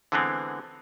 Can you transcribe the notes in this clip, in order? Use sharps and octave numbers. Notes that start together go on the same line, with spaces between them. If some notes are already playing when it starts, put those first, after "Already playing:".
D3 E3 G#3 B3 C4